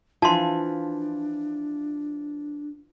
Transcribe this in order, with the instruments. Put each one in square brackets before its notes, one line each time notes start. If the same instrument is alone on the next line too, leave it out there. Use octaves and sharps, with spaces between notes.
[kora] E3 F3 [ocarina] D4 [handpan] F4 [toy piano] A5 C6